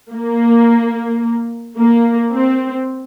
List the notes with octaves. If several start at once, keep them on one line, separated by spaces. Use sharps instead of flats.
A#3
A#3
C4